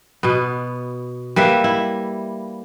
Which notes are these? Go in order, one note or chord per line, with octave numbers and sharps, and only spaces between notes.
B2 B3
G3 A#3 B4 E5
E4